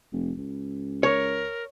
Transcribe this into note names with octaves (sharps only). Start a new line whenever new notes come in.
F1
C#2
A#4 C#5